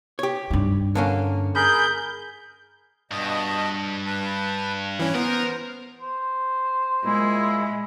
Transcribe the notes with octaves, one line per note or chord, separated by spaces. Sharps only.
G4 C#5
G2 D#4
D3 A#3 C#4
G#4 A#4 B5 G6
G2 B2 D#5 A5
B4 A5
E3 C#4
B3 A#4 C5
C5
A#2 G#3 E4